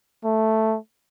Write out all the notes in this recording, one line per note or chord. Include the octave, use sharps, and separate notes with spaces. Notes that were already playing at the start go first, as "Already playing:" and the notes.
A3